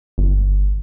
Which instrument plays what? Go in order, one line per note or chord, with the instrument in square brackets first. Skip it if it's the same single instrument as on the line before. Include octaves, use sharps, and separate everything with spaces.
[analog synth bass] G1